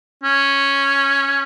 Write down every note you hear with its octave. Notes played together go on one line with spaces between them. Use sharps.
C#4